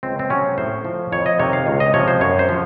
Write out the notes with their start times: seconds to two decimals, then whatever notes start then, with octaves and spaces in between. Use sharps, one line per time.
0.03 C#2 C4
0.19 C4
0.30 C3 F#3 C#4
0.58 A2 C5
0.85 F3
1.12 F2 C#5
1.26 D#5
1.39 C3 D#3 C#5
1.53 F5
1.67 C#2
1.80 D#5
1.94 C3 F3 C#5
2.08 C5
2.21 F#2 C#5
2.39 C5
2.49 F3